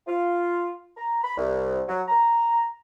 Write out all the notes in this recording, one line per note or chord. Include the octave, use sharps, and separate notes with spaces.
F4
A#5
B5
C2
F#3
A#5